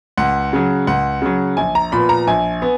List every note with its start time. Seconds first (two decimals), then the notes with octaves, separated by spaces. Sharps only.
0.18 C#2 F#5
0.53 C#3 F#3
0.87 C#2 F#5
1.22 C#3 F#3
1.57 A#1 G#5
1.75 A#5
1.92 A#2 F3 B3 B5
2.09 A#5
2.27 A#1 G#5
2.62 B3